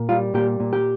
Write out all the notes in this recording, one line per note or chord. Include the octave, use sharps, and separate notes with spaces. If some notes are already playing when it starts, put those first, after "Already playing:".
Already playing: A#2
G3 F4
A#2 G4
A#2
G4